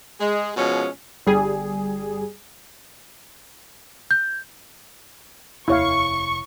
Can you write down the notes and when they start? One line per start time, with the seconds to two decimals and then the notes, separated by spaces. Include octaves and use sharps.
0.20 G#3
0.56 B2 F3 G#3 C#4
1.27 G1 G3 G#4
4.11 G6
5.68 F1 D#2 E4 C#5 F5 C#6